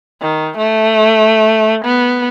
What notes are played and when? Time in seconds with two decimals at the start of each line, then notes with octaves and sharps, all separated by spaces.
0.21 D#3
0.58 A3
1.85 B3